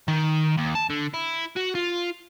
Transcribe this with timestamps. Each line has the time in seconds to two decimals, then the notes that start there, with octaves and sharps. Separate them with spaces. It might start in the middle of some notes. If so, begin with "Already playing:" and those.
0.08 D#3
0.57 D#2
0.75 A5
0.90 D3
1.14 E4
1.56 F#4
1.75 F4